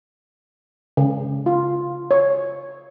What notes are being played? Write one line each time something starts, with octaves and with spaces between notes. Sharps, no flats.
C#3
F4
C#5